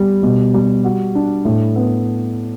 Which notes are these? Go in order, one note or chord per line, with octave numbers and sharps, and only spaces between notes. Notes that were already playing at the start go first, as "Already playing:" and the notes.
Already playing: G3 B3 G4
B2
G3
F#4
D4
A2
B3